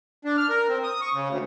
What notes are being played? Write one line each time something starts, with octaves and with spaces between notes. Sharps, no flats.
D4
F6
A#4
C4
D#6
C#6
C#3
D2